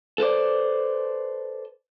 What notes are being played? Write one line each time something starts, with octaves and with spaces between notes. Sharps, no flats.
A4 B4 C5 D5